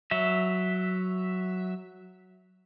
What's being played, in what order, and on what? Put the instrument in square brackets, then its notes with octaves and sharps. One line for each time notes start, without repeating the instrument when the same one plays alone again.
[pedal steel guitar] F#3 E5